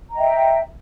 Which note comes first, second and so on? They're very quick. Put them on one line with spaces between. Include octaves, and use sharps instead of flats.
A#5 D#5 G5 E5